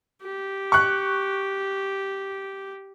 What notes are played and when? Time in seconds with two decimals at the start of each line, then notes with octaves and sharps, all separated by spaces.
0.22 G4
0.72 C#6 F#6